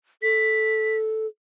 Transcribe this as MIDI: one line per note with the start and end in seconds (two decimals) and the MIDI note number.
0.22 1.26 69
0.22 0.96 95